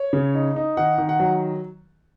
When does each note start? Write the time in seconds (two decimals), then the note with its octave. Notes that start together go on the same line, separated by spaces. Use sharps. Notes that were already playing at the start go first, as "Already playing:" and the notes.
Already playing: C#5
0.13 C#3
0.34 D#4
0.56 D#4
0.77 D#3 F#5
0.98 D#3
1.09 F#5
1.20 F#3